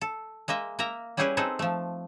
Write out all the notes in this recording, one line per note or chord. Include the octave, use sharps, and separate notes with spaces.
A4
G#3 A#3 D#5 E5
A#3 A#4 E5 A#5
G3 C#4 E4 G4 G#4 B4
C4 D#4 G#4 A4 B4
F3 A3